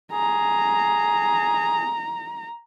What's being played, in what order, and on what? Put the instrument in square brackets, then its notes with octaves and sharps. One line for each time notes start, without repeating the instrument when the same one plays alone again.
[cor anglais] G#4 [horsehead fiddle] A#5